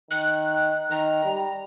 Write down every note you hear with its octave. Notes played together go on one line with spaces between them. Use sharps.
D#3 F#6
D#3 A#5
G3